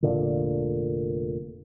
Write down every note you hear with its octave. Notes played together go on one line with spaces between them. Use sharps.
F1 A#2 D3